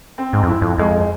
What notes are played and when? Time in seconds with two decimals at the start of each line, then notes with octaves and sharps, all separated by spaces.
0.18 C4
0.33 G#2
0.43 F2
0.48 E4
0.62 F2
0.78 F2 G#3